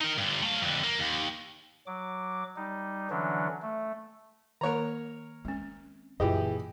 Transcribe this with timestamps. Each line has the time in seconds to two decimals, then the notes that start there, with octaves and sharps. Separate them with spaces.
0.01 D#4 A#4
0.18 G2 D3
0.43 A3 F5
0.62 F2 D3
0.84 A#3
0.99 D#2
1.87 F#3 D6
2.56 G3 D#4
3.10 D3 E3 F#3 C#4 D4
3.62 A3
4.61 D#3 A#3 A#4 C#5 A#5
5.45 G#3 C4 C#4
6.20 F#2 A#2 E3 F4 G4 G#4 D#5